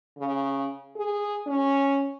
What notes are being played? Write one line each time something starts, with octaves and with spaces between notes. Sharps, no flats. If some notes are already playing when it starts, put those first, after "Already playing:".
C#3
G#4
C#4